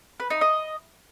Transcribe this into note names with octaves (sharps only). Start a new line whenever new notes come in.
B4
D#4
D#5